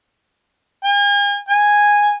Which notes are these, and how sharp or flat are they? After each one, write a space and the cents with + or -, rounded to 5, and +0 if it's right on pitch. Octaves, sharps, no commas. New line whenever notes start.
G#5 -40
G#5 -5